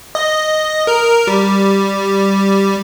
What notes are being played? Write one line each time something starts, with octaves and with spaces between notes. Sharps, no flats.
D#5
A#4
G3